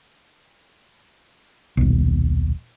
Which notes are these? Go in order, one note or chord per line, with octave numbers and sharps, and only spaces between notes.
D#1 B1